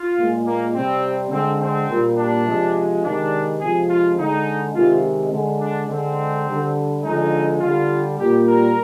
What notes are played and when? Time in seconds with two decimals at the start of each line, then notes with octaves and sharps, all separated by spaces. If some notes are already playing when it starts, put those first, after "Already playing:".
Already playing: F4
0.17 A#2 G#3
0.46 A#3
0.74 C3 G3 C4
1.31 D3 G#3 C4
1.61 C4
1.89 A#2 G3
2.17 D4
2.46 C3 F3 G#3
3.03 C3 D#3 G#3 D4
3.61 C3 F3 G#3 G#4
3.89 F4
4.18 D3 G#3 D#4
4.75 C3 D#3 G#3 F4
5.32 D3 G#3
5.61 D4
5.89 D3 G#3 C4
6.46 D3 G3
7.04 D3 F3 G#3 D#4
7.60 D3 G3 F4
8.18 A#2 G3 G4
8.47 A#4